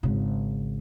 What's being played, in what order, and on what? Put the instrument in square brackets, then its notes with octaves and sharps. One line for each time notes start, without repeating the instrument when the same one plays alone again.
[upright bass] G#1 C#3